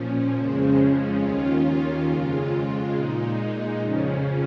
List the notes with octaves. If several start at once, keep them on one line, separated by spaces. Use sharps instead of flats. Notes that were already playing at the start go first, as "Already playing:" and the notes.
Already playing: A#2 F3 C#4
F2 C#3 F3 G#3 C#4
D#2 D#3 C#4 F4
F2 C#3 G#3 F4
A#2 G#3 D#4
F2 C#3 F3 C#4